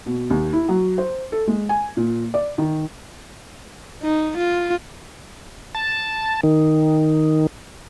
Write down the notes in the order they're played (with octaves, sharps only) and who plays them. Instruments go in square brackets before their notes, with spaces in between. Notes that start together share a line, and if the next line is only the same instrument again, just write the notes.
[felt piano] B2
D#2
E4
F#3
C5
A4
G#3
G#5
A#2
D5
D#3
[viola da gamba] D#4
F4
[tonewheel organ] A5
D#3